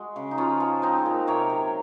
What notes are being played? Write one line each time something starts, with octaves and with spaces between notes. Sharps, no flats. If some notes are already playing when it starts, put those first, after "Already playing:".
Already playing: G#3 F#4
C#3
D#4
F3 C#4 F4
F3
G#3 C4 D#4
A#2
C3 A#4 C#5
F#3